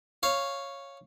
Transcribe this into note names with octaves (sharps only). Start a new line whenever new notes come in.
C#5 F5